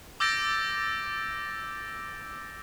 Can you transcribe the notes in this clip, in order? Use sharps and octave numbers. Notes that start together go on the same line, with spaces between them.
D6 E6 G6 A6 A#6 D7